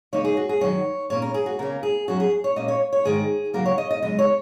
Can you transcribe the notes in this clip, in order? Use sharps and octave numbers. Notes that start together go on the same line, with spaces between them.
C#3 A#3 D#4 C#5
G#4
F#4
G#4
F#2 D#3 F#3 C#5
A#2 A#3 C#4 C#5
A#4
G#4
F#4
C#3 A#3 C#4 A#4
G#4
F#2 F#3 C#4 F#4
G#4
C#5
A#2 A#3 C#4 D#5
C#5
C#5
G#2 D#3 G#3 G#4
C#3 F#3 A#3 A#4
C#5
D#5
D#5
F#2 C#3 G#3 D#5
C#5